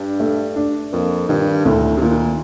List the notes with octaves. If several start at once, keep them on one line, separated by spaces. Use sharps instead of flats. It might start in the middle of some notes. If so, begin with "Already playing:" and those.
Already playing: G2 D4
A3
D4
F2 A#3
G2 D#3
D2 A2
C3
A#2 D#3